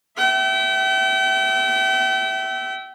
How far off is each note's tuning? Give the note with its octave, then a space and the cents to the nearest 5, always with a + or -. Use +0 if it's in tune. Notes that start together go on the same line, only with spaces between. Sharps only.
E5 +0 G5 -40